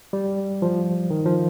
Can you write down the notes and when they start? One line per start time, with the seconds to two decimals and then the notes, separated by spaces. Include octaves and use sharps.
0.13 G3
0.62 F3
1.10 D#3
1.26 F3